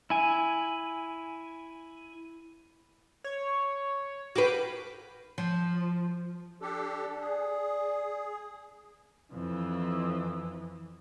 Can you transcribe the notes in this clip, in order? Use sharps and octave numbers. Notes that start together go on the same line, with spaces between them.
E4 G#5
C#5
F#4 B4 F5 G5 D6
F3
D4 G4 A4
D5
G#4
F2 E3